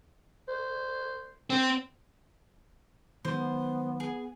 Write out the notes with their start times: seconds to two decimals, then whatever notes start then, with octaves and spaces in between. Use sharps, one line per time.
0.48 C5
1.50 C4
3.25 D#3 F#3 G#3 B3 C5
4.00 G#4